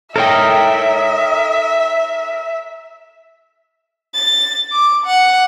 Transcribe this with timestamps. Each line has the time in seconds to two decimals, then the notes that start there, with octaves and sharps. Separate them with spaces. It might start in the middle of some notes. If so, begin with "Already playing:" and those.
0.16 D#4 A4 A#4 C#5 E5 G5
4.15 A6
4.72 D6
5.06 F#5